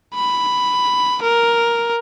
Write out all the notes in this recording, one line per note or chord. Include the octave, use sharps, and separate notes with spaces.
B5
A#4